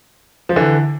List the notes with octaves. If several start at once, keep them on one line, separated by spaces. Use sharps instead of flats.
F3
D3 E3